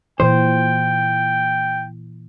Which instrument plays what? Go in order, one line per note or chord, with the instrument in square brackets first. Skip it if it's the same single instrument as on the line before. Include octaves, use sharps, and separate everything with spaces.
[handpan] A#2 E3 [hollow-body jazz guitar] C5 [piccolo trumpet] G5